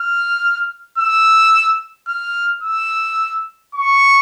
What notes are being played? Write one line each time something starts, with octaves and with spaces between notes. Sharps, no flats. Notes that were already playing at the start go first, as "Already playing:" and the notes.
Already playing: F6
E6
F6
E6
C#6